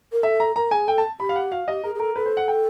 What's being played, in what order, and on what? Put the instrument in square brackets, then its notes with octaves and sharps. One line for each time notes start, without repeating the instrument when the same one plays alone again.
[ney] A#4
[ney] A4 [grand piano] E5
[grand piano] A#5
[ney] A#4 [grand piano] A#5
[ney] G#4 [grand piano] G#5
[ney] A4 [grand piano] G5
[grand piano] A5
[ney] G4 [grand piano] B5
[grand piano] F5
F#5
[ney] F#4 [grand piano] F5
[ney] G4 [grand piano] D#5
[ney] G#4 [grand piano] A#4
[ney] G#4
[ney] A4 [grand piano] A#4
[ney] A4 [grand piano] B4
[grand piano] C5
F#5
G5